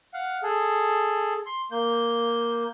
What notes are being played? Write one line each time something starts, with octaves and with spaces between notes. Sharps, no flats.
F5 F#5
G#4 A4
C6
A#3 G6